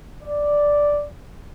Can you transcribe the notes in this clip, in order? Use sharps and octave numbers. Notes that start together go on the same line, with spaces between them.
D5